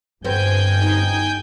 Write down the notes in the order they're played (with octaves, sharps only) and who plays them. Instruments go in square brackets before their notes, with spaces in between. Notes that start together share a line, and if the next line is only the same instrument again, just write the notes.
[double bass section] G1 [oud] B3 C4 [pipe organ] G5 G#5 G6
[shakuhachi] D#4